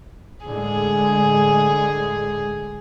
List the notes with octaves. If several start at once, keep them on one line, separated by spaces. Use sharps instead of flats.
A2 D3 G#3 G#4